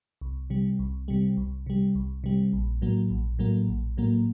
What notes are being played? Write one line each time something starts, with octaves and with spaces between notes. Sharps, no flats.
C2
C3 G3
C2
C3 G3
C2
C3 G3
C2
C3 G3
A#1
A2 F#3 A#3
A#1
A2 F#3 A#3
A#1
A2 F#3 A#3